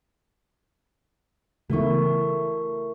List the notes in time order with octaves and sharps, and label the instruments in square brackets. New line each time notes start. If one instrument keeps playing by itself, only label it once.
[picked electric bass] C#3 E3 B3 [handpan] A3 E4 [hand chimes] F#4 A#4 C#6